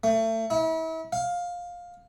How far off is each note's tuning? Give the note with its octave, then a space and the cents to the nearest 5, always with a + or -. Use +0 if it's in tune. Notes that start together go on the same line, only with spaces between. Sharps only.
A3 +30
E4 -40
F5 +15